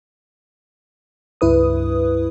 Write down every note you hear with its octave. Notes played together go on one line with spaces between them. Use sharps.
C#2 G2 E4 B4 D#6